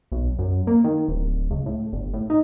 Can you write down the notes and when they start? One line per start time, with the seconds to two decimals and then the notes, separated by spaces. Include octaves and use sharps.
0.12 B1
0.39 F#2
0.67 A#3
0.84 D#3
1.08 D1
1.51 C#2
1.66 A2
1.93 G1
2.14 A2
2.30 D#4